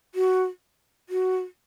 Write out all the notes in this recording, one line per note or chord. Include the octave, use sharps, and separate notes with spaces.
F#4
F#4